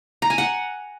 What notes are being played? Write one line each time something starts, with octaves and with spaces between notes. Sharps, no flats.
A#5
G#5
F#5